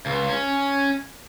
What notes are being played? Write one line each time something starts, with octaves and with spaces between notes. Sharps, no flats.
C#2
C#4